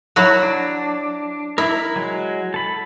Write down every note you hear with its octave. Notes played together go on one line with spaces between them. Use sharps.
F#3 E4 F#4
D4
E4 A#4 B5
F#3 G#3
A4 B5